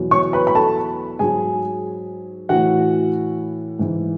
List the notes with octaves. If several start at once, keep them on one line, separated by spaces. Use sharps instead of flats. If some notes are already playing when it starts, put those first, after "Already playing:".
Already playing: E2 B2 F#3
C#5 C#6
B4 B5
B5
A4 A5
G#2 F#3 G#4 G#5
A2 E3 F#4 F#5
G#2 E3